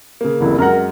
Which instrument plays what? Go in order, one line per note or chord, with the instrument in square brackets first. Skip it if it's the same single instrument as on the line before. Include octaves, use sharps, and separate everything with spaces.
[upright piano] C#3 A#3
[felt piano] F1 C2 [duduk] E4
[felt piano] F#2 G#3 [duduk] A#4 [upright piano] F#5 A#5 F6